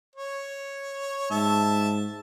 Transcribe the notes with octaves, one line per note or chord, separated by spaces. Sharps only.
C#5
G#2 E5 A5